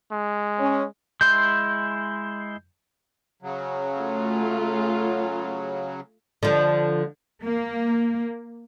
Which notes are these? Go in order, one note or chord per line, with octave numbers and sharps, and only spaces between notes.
G#3
C#4
G#3 E4 C6 G6
C#3 F#3
A3 F4
D3 F3
A#3